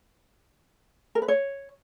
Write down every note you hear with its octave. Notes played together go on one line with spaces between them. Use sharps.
A#4
B4
C#5